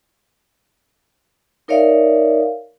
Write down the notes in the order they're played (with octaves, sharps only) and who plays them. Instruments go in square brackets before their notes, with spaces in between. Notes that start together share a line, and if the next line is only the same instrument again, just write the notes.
[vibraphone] D#4 A#4 C#5 D5 E5 F5